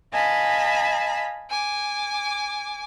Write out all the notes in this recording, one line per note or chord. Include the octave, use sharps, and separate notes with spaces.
D#5 F5 G#5 A5 B5
G#5 D6